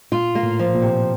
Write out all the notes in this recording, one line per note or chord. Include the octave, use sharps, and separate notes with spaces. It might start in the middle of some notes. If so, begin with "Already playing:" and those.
A#2 F4
A#3
A2
F3
A#2
C3